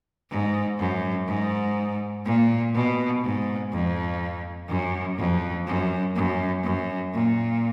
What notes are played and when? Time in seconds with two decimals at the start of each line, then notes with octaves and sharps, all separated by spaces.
0.30 G#2
0.79 F#2
1.27 G#2
2.25 A#2
2.74 B2
3.23 G#2
3.72 F2
4.68 F#2
5.18 F2
5.67 F#2
6.16 F#2
6.63 F#2
7.13 A#2